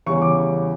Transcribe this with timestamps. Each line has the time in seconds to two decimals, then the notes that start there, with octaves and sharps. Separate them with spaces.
0.06 E2 C#3 G3 C#4 C#6
0.22 D6